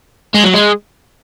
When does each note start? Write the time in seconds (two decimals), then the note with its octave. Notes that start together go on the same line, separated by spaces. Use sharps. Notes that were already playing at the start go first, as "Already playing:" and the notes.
0.35 G#3
0.44 F#3
0.54 G#3